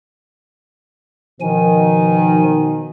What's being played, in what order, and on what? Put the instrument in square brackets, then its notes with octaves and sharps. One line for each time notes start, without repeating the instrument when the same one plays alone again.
[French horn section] B2 D#3 [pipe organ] F3 G#5